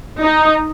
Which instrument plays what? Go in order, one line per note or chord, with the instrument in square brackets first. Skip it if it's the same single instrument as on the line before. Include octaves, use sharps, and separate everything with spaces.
[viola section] D#4